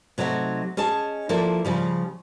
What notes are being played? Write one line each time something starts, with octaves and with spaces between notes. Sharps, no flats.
C3 F#3 A3 D#4 F#4
C#4 G#4 D#5 A5
F3 A#3 E4 A4 D5
C#3 F3 G3